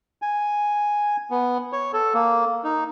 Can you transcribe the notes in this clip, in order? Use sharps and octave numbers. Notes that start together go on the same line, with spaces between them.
G#5
B3
C#5
A4
A#3
D#4